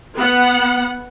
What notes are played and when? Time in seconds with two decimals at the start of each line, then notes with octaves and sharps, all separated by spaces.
0.16 B3 F#5